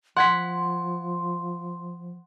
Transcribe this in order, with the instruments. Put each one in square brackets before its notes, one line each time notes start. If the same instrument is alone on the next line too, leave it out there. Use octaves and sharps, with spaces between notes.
[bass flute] F3 [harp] F#5 G#6 B6 [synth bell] C6